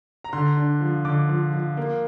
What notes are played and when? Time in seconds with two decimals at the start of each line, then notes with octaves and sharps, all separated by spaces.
0.24 A#5
0.33 D3 C6
0.57 D4
0.81 F3
1.05 D3 D6
1.29 F3
1.53 F3
1.77 A#3